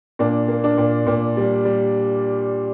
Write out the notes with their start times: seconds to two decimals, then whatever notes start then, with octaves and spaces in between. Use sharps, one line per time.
0.19 A#2 D4
0.48 A#3
0.64 D4
0.78 A#2
1.07 A#2
1.37 G3
1.65 G3